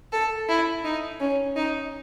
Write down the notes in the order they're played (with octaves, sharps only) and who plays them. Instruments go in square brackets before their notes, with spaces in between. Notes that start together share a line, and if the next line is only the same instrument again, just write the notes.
[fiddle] A4
E4
D#4
C#4
D#4